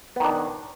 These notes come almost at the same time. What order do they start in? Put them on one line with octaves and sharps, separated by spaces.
B3 D#3 D4